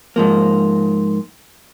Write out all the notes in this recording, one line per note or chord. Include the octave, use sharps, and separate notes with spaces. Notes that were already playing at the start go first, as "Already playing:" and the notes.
G#2 F3 A#3